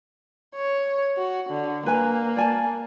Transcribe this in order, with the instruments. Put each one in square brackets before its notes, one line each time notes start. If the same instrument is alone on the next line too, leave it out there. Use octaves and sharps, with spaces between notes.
[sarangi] C#5
F#4
D3
[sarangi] A#3 [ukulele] B4 G#5
[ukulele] D5 G#5 A5